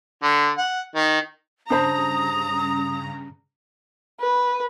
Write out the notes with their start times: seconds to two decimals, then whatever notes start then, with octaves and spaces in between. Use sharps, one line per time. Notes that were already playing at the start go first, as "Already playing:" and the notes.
0.23 D3
0.58 F#5
0.95 D#3
1.70 G2 C#3 D4 C5 A#5 B5 D#6
4.21 B4